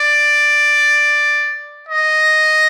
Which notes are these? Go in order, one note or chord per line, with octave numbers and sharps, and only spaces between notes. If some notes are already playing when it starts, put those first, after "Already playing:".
Already playing: D5
D#5